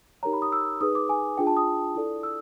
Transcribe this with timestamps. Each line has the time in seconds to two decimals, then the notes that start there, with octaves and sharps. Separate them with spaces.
0.23 D#4 G4 A#4 C#5 A#5
0.33 B5
0.42 D#6
0.52 E6
0.81 D#4 G#4 B4 D#6
0.95 D6
1.09 G#5
1.38 D4 F4 G#4 G5
1.47 A5
1.57 D#6
1.96 E4 A4 D5
2.23 E6